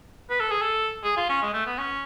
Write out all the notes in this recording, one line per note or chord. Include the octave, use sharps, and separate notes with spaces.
B4
A4
G#4
A4
G#4
F4
C#4
G#3
A3
B3
C#4